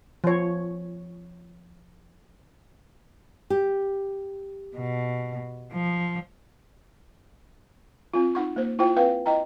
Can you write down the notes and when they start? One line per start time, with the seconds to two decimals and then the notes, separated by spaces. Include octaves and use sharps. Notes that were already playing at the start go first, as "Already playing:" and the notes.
0.24 F3 C#5
3.50 G4
4.76 B2
5.73 F3
8.14 C4 F4
8.35 D#4 F#5 C#6
8.56 A#3 C5
8.79 E4 F4 C5 G5
8.96 C4 B4 F5 G5
9.26 E4 D#5 G5 A#5